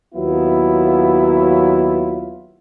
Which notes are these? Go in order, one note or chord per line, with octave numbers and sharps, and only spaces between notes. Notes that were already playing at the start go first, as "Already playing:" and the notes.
D#2 F#3 B3 E4 F4